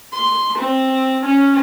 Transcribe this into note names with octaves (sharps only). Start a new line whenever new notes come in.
C6
C4
C#4